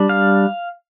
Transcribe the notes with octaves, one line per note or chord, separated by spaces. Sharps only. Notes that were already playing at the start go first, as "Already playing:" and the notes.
Already playing: G3 D4
F5